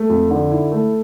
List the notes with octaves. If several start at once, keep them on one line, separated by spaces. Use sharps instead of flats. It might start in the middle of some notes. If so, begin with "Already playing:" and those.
Already playing: A3
F2
D3
E4
A3